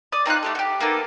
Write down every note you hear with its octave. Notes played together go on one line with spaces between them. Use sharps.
D5 D#6
C4 D#4 F4 F#6
A3 G4 A4
F#4 G4
A#3 B3 D#4 A4